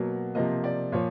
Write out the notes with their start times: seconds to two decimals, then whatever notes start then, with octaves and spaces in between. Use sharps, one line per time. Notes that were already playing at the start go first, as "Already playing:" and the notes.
Already playing: B2 F#3 A#3
0.35 C3 F3 A#3 D#5
0.64 D5
0.92 A#2 F3 C#5